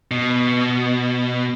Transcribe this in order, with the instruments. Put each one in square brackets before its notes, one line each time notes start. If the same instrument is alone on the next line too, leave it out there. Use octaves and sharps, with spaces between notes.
[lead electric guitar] B2